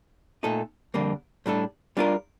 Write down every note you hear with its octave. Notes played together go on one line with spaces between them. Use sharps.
A#2 A3 D#4 A4
F2 D3 G3 A#3
A2 G3 D4 A4
G3 D4 F4 A#4